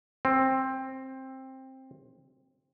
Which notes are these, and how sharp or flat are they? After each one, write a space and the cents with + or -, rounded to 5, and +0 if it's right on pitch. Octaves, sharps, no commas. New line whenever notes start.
C4 +15